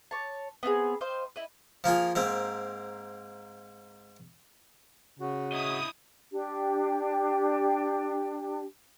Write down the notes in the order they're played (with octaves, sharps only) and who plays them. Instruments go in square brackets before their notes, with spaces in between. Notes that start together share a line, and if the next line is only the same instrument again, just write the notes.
[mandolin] C#5 A5
B3 C4 D#4 G#4
C5 D#5 F5
E4 D#5
[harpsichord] F3 A#3 F4 G#4
G#2 A#3 C4
[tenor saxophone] C#3 [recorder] F#4
[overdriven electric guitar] E4 D#5 [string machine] D#6
[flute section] D4 G4